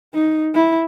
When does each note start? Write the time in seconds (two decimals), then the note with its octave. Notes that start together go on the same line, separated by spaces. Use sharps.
0.14 D#4
0.54 E4